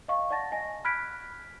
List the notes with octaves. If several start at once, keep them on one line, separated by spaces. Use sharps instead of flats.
D#5 F5 C#6
D5 F#5 A5 A6 A#6
D#5 G#5 A#6
B5 F6 F#6 G#6 B6 D7